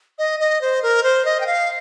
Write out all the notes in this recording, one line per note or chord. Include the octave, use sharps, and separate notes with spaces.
D#5
D#5
C5
A#4
C5
D#5
G5
F5